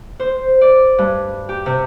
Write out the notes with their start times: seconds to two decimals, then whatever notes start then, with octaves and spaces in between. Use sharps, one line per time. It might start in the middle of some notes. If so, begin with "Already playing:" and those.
0.20 C5
0.61 D5
0.98 G2
1.49 G4
1.66 C3